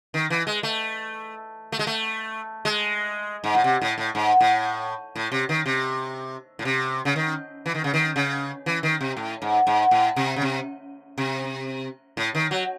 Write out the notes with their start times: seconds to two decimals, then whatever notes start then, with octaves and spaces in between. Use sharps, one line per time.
0.14 D#3
0.30 E3
0.47 G#3
0.63 A3
1.72 A3
1.79 G#3
1.87 A3
2.65 G#3
3.44 G#2
3.55 A2
3.64 C3
3.82 A2
3.98 A2
4.15 G#2
4.41 A2
5.16 A2
5.32 C3
5.49 D#3
5.66 C3
6.59 A2
6.65 C3
7.05 C#3
7.16 D#3
7.66 E3
7.75 D#3
7.84 C#3
7.94 D#3
8.16 C#3
8.66 E3
8.83 D#3
9.01 C3
9.17 A2
9.42 G#2
9.67 G#2
9.91 A2
10.16 C3
10.36 C#3
10.42 C3
11.18 C3
12.17 A2
12.35 D#3
12.51 F#3